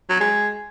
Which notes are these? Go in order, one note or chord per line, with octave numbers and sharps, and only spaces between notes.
F#3
G#3